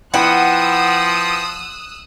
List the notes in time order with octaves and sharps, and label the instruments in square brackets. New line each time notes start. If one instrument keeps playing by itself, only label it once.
[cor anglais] F3 [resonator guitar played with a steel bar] B3 E4 G5 [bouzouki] F#5 [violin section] D#6 E6 F#6